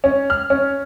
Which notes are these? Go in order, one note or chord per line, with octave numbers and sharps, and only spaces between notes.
C#4
F6
C#4